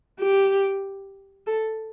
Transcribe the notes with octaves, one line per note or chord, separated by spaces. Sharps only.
G4
A4